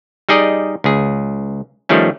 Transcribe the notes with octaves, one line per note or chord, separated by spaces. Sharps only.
G3 D#4 G#4 D5 D#5
C#2 G#4
D#3 F3 G3 A3 C#4